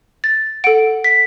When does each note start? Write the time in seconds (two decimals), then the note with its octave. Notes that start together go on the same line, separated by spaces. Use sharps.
0.24 A6
0.64 A4 F#5 D7
1.04 B6